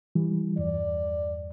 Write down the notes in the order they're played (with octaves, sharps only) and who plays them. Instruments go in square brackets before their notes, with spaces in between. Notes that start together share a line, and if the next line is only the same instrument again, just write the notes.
[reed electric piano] E3 F3 G3
[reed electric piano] E2 G2 [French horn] D5